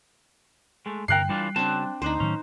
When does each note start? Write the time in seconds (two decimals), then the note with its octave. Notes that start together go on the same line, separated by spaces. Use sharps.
0.86 G#3 A3
1.08 C2 G2 D3 A#4 G5 F#6 C7
1.29 E3 G3 D4 F4
1.56 C#3 C4 D4 F#4 A5
2.02 D2 C4 D4 D#4 C5
2.20 A2 D#3 F#3 C#4